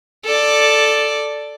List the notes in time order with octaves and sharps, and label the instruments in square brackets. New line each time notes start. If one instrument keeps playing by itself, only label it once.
[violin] A4 D5